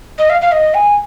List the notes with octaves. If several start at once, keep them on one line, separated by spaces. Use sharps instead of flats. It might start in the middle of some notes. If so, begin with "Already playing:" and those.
D#5
F5
F5
D#5
G#5